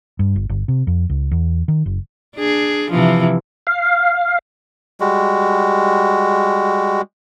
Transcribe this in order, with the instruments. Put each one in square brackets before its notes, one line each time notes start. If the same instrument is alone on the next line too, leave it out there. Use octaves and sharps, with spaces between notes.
[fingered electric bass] G2
G1
G1
C3
F2
C#2
E2
D#3
F#1
[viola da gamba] D4 G#4
C3 E3 F3
[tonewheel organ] F5
[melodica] G3 G#3 F#4